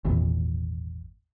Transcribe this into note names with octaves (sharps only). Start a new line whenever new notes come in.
G#1 E2 A#2